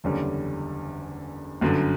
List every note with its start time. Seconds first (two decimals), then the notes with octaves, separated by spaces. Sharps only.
0.04 F#1 E2 D3 G3 C#4
1.61 G1 F#2 D3